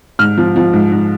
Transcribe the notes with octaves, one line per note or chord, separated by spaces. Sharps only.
G#2 F6
F3
F3
G#2
G#2